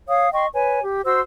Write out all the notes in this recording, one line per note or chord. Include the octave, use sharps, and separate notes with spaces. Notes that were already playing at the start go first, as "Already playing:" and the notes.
C#5 F5 D#6
D#5 G5 C6 C#6
B4 C#5 G#5
G4
F#4 C5 C6 E6